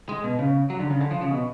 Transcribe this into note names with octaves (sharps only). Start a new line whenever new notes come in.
G#3
B2
C#3
F#3
D3
C#3
D3
F3
C#3
B2